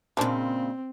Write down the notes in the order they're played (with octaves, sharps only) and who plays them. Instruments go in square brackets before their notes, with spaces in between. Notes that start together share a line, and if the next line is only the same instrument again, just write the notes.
[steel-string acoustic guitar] A#2 C#3 [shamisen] G#3 D4 C5 [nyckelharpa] C4